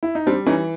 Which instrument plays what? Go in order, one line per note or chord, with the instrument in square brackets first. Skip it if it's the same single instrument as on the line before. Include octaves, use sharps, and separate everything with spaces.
[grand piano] E4
D#4
[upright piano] G3 [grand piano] C4 D4
[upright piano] E3 [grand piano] C#4 D#4